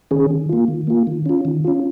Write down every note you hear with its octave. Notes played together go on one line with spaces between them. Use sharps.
D#3 C#4 G#4
D#3
A#3 F4
D#3
A#3 F4
D#3
C#4 F4
D#3
C#4 F4